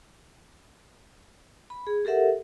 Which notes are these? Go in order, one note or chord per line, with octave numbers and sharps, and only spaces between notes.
B5
G#4
G4 A4 A#4 E5 F#5